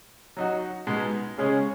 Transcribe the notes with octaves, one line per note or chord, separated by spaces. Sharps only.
F#3 D#4 F#4
B2 G#3 B3 D#4
C#3 G#3 C#4 G#4